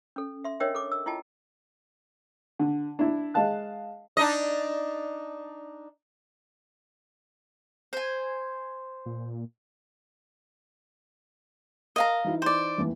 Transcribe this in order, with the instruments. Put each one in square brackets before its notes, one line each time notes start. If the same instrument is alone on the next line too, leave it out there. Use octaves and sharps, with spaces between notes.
[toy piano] C#4 A4
E5 C6
D4 A#4 C#5 D#5 E5 G5
A4 D6
E6
E4 F4 D#5 G5 A5
[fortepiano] D3
D4 E4
G#3 D#5 F5 A5 F#6
[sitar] D4 D#4 D#5
[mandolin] C5 G#5
[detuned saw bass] A#2
[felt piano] A#4 [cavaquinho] D#5 F5 A#5
[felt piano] E3 D#4 E4
[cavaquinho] C5 D5
[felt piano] F1 D#2 E3